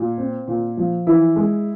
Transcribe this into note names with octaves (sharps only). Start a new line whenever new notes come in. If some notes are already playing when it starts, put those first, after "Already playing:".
Already playing: A#2
C4
A#2
F3
E3 E4
G#3